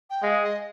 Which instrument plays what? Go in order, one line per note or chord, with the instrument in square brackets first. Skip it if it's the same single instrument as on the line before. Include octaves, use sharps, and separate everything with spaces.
[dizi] G5
[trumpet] G#3 [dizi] F5
[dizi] D#5